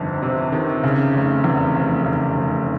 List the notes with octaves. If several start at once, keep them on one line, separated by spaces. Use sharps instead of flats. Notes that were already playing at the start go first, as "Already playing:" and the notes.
Already playing: G1 F2 C3 D#3
C3
D#3
C#3
F1
E2
F1
C#3
F1